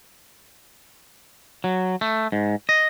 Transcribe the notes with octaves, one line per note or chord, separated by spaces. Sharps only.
F#3
A3
G#2
D#5